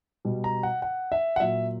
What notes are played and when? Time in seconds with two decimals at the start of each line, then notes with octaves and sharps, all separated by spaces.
0.25 B2 G3
0.44 A#5
0.63 F#5
0.82 F#5
1.12 E5
1.36 F#5
1.40 A#2 F#3 E5